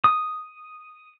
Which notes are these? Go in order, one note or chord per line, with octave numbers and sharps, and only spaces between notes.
D#6